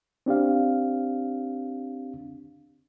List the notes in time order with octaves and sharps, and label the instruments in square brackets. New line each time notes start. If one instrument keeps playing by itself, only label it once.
[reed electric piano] C4 D4 G4 F5